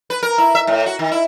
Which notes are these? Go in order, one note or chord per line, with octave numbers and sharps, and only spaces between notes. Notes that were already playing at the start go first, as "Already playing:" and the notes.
B4
A#4
E4
E5
A2
F#4
D#3
E4